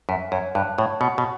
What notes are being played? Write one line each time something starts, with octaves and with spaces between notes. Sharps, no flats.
F#2 E5
F#2 C#5
G2 F#6
A2 C#5
B2 F#5
B2